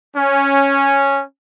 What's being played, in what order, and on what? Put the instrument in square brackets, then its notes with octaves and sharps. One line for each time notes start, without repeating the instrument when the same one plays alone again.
[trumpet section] C#4